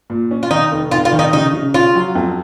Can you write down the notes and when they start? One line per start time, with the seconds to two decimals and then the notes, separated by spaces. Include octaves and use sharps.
0.10 A#2
0.31 C#4
0.43 F4
0.51 D#3 D#4
0.72 F1
0.91 F1 F4
1.05 F4
1.13 D#3
1.19 D#4
1.33 C#3 D#4
1.53 C#3
1.74 C#4 F4
1.95 F#3
2.15 F2